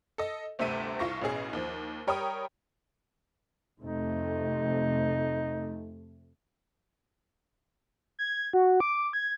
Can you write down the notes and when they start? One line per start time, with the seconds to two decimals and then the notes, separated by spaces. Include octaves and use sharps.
0.18 A4 D#5
0.59 G1 D2 C3 A3 E5 D#7
0.99 C2 F4 C#6 A#6
1.22 A1 B2 C#4 G#4
1.53 D#2 F3
2.07 G3 A#4 C#5 G5 B5 D#6
3.80 F2 C3 A3 D#4
8.19 G#6
8.53 F#4
8.80 D6
9.13 G#6